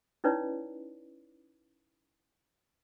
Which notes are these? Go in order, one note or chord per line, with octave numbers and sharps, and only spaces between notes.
C#4 D#4 E4 B4 C#5 D5